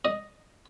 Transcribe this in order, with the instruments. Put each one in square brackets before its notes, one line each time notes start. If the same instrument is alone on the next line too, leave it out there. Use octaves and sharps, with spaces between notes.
[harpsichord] D#5